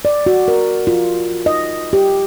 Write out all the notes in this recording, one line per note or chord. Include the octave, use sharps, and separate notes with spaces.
D5
F#4
A#4
F4
D#5
G4